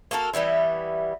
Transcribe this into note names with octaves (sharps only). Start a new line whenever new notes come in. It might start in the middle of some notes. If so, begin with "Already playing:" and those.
A#3 F#4 A4 A#4
E3 G3 B3 E4